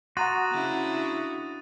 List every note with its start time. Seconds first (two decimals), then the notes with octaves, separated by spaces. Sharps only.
0.17 F#4 F#5 A#5 C6 D#6 A6 D#7
0.51 C#3 D4 E4